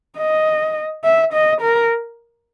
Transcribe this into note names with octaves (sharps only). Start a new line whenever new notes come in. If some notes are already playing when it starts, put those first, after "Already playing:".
D#5
E5
D#5
A#4